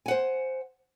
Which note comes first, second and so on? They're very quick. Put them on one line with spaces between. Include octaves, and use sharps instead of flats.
G#5 F#5 C5